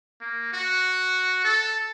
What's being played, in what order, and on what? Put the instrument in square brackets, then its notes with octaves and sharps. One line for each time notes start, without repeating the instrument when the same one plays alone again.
[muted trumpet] A#3
F#4
A4